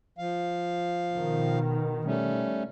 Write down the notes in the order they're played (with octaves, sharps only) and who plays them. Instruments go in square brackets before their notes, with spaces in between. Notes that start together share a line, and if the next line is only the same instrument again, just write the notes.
[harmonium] F3 F5
[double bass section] B2 D#3
[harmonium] G3 A3 C#4